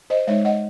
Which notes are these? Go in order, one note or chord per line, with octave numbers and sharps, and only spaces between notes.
C5 D#5
G#3 D#4 C#5 E5
D#5 F#5